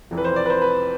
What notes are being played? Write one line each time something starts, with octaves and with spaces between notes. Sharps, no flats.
F1 F2 E3
B4
C5
D5
B4
C5
B4